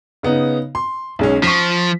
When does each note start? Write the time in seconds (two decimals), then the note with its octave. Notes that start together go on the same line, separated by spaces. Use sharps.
0.23 C#3 B3 D#4
0.75 C6
1.19 B1 G#3 C#4
1.43 F3 C#6 B6